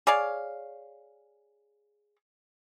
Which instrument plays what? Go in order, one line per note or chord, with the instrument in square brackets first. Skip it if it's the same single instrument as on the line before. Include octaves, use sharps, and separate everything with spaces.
[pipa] G#4 C#5 D5 F5